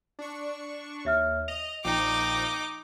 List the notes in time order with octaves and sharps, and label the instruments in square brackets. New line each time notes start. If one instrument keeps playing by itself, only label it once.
[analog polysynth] D4 C#6
[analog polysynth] D#2 [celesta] C#5 E5 F6
[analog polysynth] D#5 [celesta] F7
[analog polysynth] A#1 F3 G5 [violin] D#4 D6